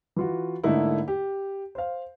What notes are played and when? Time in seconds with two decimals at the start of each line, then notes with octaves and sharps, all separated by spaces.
0.16 E3 F4 F#4
0.64 G#2 D3 A3 A#3 D#4 E4
1.08 G4
1.75 C5 F5